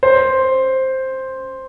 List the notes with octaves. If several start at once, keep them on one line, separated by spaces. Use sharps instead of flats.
C5